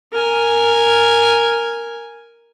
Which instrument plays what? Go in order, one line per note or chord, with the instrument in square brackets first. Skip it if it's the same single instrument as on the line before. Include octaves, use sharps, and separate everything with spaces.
[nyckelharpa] A#4 G#5